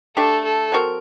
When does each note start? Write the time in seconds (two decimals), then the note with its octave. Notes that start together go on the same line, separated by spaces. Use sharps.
0.16 A3 D4 G4 A4
0.45 A4
0.72 F#3 C4 F#4 A#4